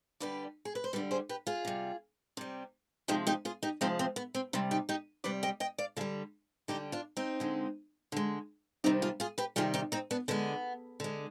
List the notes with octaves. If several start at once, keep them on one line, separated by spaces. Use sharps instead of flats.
D3 G3 B4 D5
G#4
B4
C5
D3 G3 B4 D5
G#4 C5
G4 B4
F4 G#4
C3 G3
C3 G3
C3 F3 G#3 D#4 G4
D#4 G4
F4 G#4
D#4 G4
C3 F3 G#3 C4 D#4
C4
B3
C4
C3 G3 C4
D#4 G4
D#4 G4
C3 G3 B4 D5
D#5 G5
D#5 G5
D5 F5
D3 G3 F4 G#4
D3 G3 D#4 G4
D4 F4
C4 D#4
D3 G#3
D3 G#3
C3 D#3 G3 C4 D#4
F4 G#4
F4 G#4
G4 B4
C3 D#3 G3 F4 G#4
D#4 G4
C4 D#4
B3 D4
D3 G#3 B3
D3 G#3